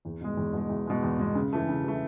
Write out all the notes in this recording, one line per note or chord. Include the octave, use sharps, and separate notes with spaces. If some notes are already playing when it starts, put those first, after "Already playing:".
E2
B2 G#3
E2
B2 G#3
E2
B2 G#3
E2
B2 G#3
C#3
E3 A3
C#3
E3 A3